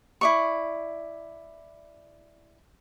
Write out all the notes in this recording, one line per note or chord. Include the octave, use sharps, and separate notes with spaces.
E4 D5 C#6